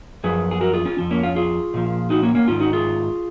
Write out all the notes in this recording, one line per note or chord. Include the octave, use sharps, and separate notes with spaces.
F#2 F3 G#4 B4
G#4
F#4 A#4
F4 G#4
C#4 F4
F2 F3
A#3 C#4
C#4 F4
F4 G#4
A#2 F3
D#4 F#4
A#3 C#4
A#3 C#4
G#2 D#3 C#4 F4
D#4 F#4
F4 G#4